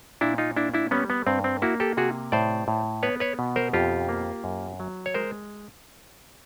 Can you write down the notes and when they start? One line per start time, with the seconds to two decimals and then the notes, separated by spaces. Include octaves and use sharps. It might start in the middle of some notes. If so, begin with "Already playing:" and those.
0.21 A#2 D4 E4
0.38 D#4 F4
0.56 A#3 D4 E4
0.74 D4 E4
0.91 G3 B3 C#4
1.10 B3
1.27 G2 C4
1.44 C4
1.62 A#3 E4 F#4
1.80 G4 A4
1.97 C3 F#4 G#4
2.32 A2 C5 D5
2.68 A2
3.03 B3 B4 C#5
3.20 B4 C#5
3.39 B2
3.56 A#4 C5
3.73 F2 F4 G4
4.09 A#3
4.44 F#2
4.80 F#3
5.06 C#5
5.14 G#3 A#4 C5